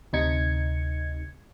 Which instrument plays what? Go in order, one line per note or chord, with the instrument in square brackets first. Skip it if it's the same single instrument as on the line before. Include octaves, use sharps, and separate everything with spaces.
[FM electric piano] D2 C3 D#4 G#6 C#7